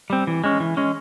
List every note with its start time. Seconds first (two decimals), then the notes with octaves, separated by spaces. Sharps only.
0.10 G3 C4
0.27 E3
0.44 G#3 C#4
0.60 E3
0.77 G#3 C#4